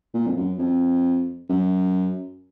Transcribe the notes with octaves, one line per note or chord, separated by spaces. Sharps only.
A#2
F2
F#2
F2
F#2